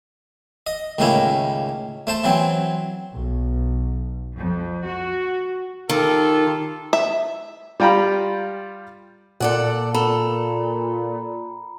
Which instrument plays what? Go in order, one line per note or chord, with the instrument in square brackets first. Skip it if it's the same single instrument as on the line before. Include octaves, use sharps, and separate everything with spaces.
[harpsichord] D#5
C#2 A2 D#3 A#3 C#4 E4
A3 C5 A5
E3 F#3 C4
[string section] B1
F2
F#4
[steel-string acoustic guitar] D#3 [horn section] F4 G4 A4
[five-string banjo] E5
[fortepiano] G3 F4 G5 A#5 B5
[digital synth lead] A#2 [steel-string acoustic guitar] A4 D5 F#5
[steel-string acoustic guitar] A4 [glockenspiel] A#5 B5